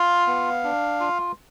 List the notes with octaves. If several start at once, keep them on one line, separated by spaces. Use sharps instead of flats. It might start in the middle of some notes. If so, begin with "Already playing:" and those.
Already playing: F4 F5
B3
D4
F4